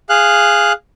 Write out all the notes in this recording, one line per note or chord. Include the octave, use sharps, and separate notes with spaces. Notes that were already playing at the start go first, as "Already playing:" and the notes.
G#4 F5 F#6